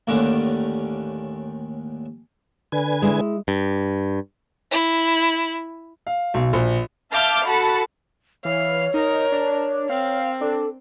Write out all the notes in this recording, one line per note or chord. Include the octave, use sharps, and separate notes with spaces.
D#2 A2 D3 D#3 C#4
D3 B4 G#5
G#3 E4
G2
E4
F5
B1
A#1
E5 F5 A5 D6 F6 G6
F#4 A4 A5 B5 C#7
E3 C#5 F5
D#4 A#4
D4
C4 F5
D4 A4